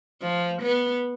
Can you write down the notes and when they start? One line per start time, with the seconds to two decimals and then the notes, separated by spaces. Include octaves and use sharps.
0.21 F3
0.62 B3